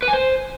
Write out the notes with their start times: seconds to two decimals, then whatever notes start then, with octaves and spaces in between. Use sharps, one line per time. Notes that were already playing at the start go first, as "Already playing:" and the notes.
0.02 B4
0.08 G#5
0.13 C5